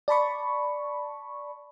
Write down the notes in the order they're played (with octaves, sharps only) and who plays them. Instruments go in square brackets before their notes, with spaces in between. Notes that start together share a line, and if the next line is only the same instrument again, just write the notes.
[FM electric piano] D5 A5 B5 C#6